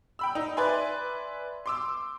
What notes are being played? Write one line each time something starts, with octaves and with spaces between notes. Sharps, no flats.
G5 B5 E6
D#4
B4 D5 E5 G#5 C6
C6 D6 E6